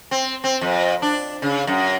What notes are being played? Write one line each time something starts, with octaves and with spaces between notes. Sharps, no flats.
C4
C4
F2
D4
C#3
F#2